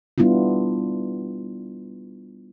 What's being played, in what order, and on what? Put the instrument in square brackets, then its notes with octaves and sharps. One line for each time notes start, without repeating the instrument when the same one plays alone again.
[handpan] G3 B3 D4 E4 F4